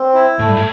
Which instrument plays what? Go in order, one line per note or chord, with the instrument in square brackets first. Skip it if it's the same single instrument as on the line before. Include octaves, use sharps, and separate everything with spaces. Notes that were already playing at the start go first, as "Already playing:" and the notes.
Already playing: [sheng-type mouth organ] C4
E4
[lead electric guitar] A2 [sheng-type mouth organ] A3
[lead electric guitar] G2
A2